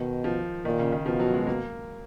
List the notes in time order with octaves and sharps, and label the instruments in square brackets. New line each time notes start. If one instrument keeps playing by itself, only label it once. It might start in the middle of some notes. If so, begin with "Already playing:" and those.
Already playing: [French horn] B2 [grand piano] D#3
[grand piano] F3
[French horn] A#2 [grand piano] D#3
[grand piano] C#3
D#3
[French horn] B2 [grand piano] F3
[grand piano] F#3
G#3
A#3